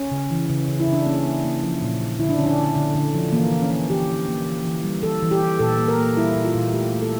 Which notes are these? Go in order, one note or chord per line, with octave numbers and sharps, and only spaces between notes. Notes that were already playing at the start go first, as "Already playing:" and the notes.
Already playing: C#4
C#3
E3
C#3
C#3
E4
C#3
D4
A#3 C#4
A#3
A#3
F3
A#2
A#2
D3 E4
D4
D3 C#4
D4
D3
D3
D3
F3
E3 A#3
E3
C#4
A#3
E3 G4
A#3
A#3
E3
E3
G3
E3 A4
E3
G4
E3
A#2 A4
A#3
A#4
A#3
G3 E4
A#2
F4
A#2
A3 G4
A3
A4